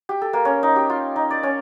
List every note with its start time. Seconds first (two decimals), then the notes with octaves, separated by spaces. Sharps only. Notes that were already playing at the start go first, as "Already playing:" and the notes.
0.09 G4
0.22 A4
0.33 A#3
0.45 C#4
0.63 D#4
0.76 G4
0.90 F4
1.16 D#4
1.30 D5
1.43 C#4